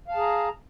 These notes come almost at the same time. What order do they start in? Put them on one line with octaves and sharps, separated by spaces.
F5 A5 G#4 A#5